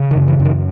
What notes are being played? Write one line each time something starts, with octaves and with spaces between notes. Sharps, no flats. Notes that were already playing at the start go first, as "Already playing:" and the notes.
Already playing: C#3
D#3
F#2
E3
F#2
D#3